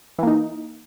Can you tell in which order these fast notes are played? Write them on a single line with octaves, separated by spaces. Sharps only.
E3 A#3 D#4